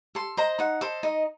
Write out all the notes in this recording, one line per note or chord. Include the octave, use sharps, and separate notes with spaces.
A4 C6
C5 D#5 A#5
D#4 F#5
A4 C5 D#5
D#4 D#5